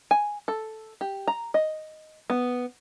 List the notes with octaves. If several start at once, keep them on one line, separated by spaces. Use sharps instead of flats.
G#5
A4
G4
A#5
D#5
B3